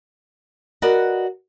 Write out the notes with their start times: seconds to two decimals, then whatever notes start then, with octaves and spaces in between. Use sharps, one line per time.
0.82 F#4 A#4 B4 D5 D#5